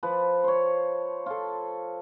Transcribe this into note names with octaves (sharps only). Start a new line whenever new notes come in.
F3 B4 A5
C5 C#5
F4 A4